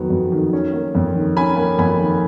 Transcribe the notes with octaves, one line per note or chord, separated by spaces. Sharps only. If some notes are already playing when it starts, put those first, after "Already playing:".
Already playing: F2 D#3 F#3 B3
F2
D#3
C#4
A#3
F2
D#3
C#4 G#5 B5
A#3
F2 G#5 B5
D#3